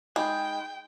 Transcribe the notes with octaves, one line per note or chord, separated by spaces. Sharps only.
G#3 D#4 G5 B5 G6